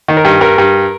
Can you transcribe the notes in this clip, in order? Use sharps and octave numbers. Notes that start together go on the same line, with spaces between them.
D#3
A#4
G2
G2 A#4
G2